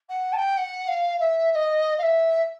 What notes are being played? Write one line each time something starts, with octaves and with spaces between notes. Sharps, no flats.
F#5
A5
G5
F#5
F5
E5
E5
D#5
F5
E5